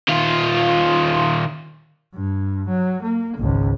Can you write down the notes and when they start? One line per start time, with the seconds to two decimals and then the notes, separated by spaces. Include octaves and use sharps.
0.08 D#3 F4
2.15 G2
2.68 F#3
3.02 A#3
3.38 G#1 C#2